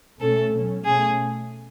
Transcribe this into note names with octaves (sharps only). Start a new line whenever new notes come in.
B2 A3 C#4 A4
B2 F#3 C#4
B2 A3 C#4 G#4